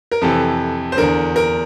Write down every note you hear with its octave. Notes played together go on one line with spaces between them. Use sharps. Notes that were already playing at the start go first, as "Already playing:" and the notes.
A#4
F2 C3 E3 A4
C5
E2 D3 A#4
A#4